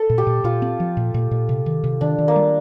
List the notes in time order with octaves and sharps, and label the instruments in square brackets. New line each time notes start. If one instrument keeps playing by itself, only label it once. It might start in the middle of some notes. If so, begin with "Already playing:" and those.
Already playing: [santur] A4
[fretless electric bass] A#2
[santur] G4
[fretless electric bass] A#2
[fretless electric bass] A#2 [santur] F4
[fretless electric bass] C4
F3
A#2
A#2
A#2
C3
D#3
C3
[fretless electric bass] D#3 [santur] D4
[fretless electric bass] D#3
[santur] A#3
[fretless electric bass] G3